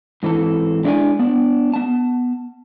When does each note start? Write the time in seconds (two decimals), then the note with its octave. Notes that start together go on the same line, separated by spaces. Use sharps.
0.23 G#2 E3 C4 A4
0.84 G#3 D4 E4 G4 D5 G#5
1.19 B3 D4
1.74 B3 A5